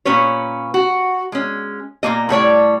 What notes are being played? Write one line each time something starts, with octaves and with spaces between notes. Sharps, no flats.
A#2 C#4 B4 C#5
F#4
G#3 C#4
A#2 G#3 A#3 D#5
A2 G3 C#5 D5